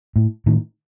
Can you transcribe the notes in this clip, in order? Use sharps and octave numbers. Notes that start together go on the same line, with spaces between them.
A2
A2 D#3